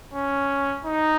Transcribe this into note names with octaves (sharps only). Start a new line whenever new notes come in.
C#4
D#4